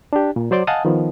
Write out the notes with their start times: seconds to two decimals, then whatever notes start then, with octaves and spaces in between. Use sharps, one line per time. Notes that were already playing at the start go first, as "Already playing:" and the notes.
0.13 D4 G4
0.36 A#2
0.51 F#3 C5 D5 C6 D6
0.67 D#5 F5 F#5 G#5 A5 D#6
0.85 D#3 F3 B3